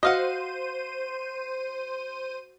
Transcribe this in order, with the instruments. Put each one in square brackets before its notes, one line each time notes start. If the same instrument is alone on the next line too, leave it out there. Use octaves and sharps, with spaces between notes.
[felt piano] F#4 [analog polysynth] C5 D#7 [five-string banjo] D#5 F5 F#5